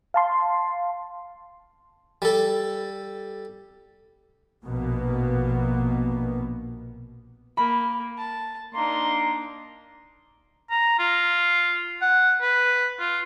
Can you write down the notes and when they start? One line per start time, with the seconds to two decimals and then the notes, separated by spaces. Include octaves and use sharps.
0.14 F5 A5 C6
2.22 G3 A4
4.64 A#1 B2 A#3 B3
7.57 A#3 B5
8.18 A5
8.75 A#3 D4 D#4 C6
10.70 A#5
10.99 F4
12.02 F#5
12.42 B4
12.99 F4